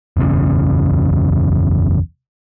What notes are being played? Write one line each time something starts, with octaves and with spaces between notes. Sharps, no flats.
F#1 B1 E2 C#3